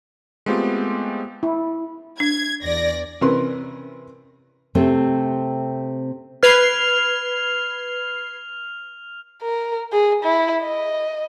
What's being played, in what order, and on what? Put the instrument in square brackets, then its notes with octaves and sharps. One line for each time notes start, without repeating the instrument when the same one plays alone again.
[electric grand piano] G#3 A3 B3 C4 F4 G4
[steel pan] E4
[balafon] D4 [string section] G#6
[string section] E2 D5 A#6
[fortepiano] C3 E3 C#4 A#4 B4 C6
[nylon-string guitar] C3 A3 C4
[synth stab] B4 G#6 C7 [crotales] F6 F7
[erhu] A#4
G#4
E4
D#5